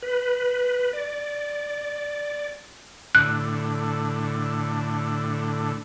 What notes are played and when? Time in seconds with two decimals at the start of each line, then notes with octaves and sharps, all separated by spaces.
0.02 B4
0.93 D5
3.15 A2 D3 F#6